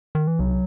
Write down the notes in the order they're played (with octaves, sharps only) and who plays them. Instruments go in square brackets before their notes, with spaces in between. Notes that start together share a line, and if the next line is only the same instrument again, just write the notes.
[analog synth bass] D#3
E3
[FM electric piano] C2 [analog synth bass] F#3